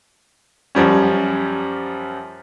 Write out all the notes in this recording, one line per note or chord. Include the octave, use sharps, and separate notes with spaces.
F#2 F3 G3 C#4